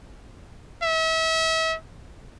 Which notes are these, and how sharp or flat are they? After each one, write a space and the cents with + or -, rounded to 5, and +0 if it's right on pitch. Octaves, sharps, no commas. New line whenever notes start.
E5 -35